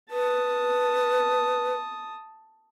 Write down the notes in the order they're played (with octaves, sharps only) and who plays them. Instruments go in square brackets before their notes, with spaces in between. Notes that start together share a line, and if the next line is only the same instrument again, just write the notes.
[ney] B4 [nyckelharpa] A5 D#6